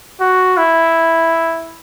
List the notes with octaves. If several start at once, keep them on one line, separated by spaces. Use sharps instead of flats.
F#4
E4